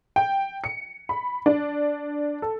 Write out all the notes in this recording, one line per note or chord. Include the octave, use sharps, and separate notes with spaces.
G5
C#7
B5
D4
A4